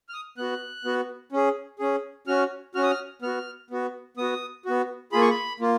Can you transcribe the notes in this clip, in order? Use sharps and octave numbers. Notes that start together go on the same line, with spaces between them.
F6
D#6
B3 F#4 F#6
B3 F#4
C#4 G#4
C#4 G#4
C#4 F#4 F6
C#4 F#4 F6
D#6
F6
B3 F#4 F6
B3 F#4
B3 F#4 D#6
B3 F#4
A#3 F4 G#4 B5
C#6
B5
A#3 F4